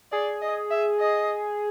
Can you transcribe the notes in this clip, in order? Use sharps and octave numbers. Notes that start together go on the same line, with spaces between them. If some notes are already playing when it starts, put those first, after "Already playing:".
G#4 D5
D#5
E5
D#5